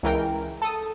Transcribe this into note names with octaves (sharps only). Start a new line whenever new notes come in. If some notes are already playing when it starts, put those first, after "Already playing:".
C#2 E3 A#4 G5
A4 D#6